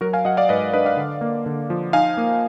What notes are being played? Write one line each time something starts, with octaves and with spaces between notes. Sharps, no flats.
F#3 F#4 A#4
F5 G#5
F#3 D#5 F#5
D5 F5
G#2 B4 D#5
D4 B4 D#5
D5 F5
D3
A#3
D3
F3
D#4 F5 G#5
A#3